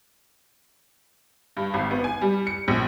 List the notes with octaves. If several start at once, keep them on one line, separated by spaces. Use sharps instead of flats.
G2
G#1
B3
G#5
G3
C#7
A#1